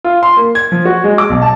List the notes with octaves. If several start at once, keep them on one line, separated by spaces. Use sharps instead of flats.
F4
C6
A#3
G#6
F3
F#4
G#3
D6
B1
A5